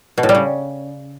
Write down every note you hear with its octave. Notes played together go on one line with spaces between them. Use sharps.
B2
A2
G3
C#3